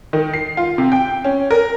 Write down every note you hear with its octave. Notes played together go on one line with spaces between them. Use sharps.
D#3
C7
F4
C3
G5
C#4
A#4